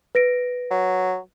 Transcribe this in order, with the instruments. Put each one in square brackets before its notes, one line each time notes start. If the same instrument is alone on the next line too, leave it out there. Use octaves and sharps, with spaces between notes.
[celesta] B4 A#6 D7
[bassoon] F#3